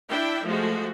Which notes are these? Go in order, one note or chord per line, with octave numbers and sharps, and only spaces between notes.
D4 E4 E5 G5
F3 G#3 A3 F#4